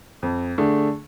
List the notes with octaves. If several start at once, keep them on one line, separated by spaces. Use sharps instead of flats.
F2
D3 A3 D4 G#4